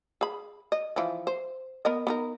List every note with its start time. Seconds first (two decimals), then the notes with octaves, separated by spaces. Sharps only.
0.21 G#4 B5
0.72 D#5
0.96 E3 F3
1.27 C5
1.85 B3 A#4 D#5
2.07 B3 D#4 A#4